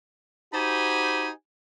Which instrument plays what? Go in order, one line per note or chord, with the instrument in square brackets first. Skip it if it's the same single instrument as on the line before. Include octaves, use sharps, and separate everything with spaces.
[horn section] D#4 F#4 G4 C5 G#5 B5